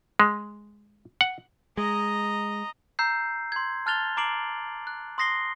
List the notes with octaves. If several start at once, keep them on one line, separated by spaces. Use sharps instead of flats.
G#3
F#5
G#3 D#5 A#5
A#5 E6 G6 C7
C6 G#6
A5 F6 F#6 A6 F7 G7
A#5 D6 C7 D7 F#7
F#6
C6 D#6 A#6 C7 G7